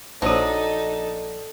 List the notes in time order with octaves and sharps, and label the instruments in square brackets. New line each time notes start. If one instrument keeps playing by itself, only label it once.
[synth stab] A#1 D#6 [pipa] F#3 D4 [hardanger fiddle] D#4 A4 [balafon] C5